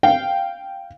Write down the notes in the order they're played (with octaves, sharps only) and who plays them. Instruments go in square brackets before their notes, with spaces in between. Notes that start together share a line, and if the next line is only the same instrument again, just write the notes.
[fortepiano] F5 G5